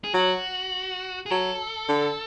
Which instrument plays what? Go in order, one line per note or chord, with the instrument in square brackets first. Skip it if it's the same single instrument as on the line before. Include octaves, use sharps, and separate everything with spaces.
[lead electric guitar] G#4
[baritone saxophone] F#3 [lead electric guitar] F#4
[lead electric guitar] G#4
[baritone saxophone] F#3 [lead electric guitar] A4
[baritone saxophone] D3